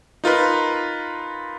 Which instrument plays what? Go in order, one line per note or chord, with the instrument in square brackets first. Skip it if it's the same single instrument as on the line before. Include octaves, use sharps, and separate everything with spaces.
[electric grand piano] D#4 F4 A#4 B4